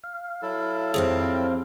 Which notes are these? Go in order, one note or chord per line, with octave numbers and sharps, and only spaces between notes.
F5
F#3 E4 A4
F2 C4 G4 G#4